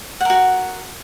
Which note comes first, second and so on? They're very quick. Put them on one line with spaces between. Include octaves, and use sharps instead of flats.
F#5 A#4 F#4